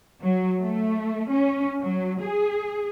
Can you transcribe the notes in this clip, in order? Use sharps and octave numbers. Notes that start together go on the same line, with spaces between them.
F#3
A3
C#4
F#3
G#4